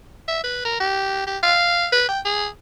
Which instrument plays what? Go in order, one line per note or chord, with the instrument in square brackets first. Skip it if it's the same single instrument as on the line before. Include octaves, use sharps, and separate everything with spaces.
[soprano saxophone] E5
B4
A#4
G4
G4
F5
B4
G5
G#4